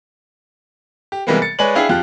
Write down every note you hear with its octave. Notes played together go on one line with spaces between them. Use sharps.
G4
C3 E3 G3 G#3 A#3 B3
A6 C#7
G#3 B4 C#5 D5 G#5 F#7
D4 E4 G#4 F5 G5
F2 F4 G4 F#6